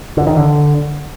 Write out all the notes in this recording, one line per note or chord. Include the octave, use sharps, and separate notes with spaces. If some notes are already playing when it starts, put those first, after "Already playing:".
D3
D#3
D3